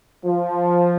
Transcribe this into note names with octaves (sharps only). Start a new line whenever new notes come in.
F3